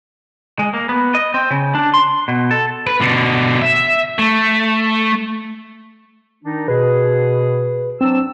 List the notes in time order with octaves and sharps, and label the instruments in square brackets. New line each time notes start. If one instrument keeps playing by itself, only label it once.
[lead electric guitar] G#3
A#3
B3
D#5
C4
C#3
D4
C6
B2
A4
[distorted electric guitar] B4
B2 D3
E5
A3
[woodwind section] D#3 D4 D#4
[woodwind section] B2 G#4 [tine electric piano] B4
[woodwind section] F#3 D4 E6 [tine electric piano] C4